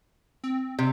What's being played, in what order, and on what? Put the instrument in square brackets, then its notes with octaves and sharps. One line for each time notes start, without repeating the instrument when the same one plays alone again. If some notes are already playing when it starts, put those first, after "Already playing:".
[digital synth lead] C4
[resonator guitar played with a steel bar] C3